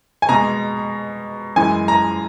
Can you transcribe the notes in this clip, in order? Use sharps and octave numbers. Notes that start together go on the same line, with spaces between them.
G#5
B2 G#3 A#5
F#2 E3 G#3 G#5
A#5